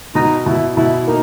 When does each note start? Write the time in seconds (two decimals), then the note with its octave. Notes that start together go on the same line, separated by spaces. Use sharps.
0.15 B2 D#4
0.46 B2 E4
0.77 B2 E4
1.07 A#3 D#4